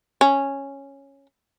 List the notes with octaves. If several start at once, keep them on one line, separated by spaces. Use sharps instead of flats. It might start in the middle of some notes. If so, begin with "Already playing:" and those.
C#4